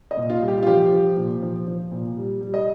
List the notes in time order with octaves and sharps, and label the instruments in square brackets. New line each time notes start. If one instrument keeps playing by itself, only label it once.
[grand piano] D#5
A#2
F4
G3
G4
F4
F3 G4
F3
A#2
F3
F3
A#2
G3
G3
D#5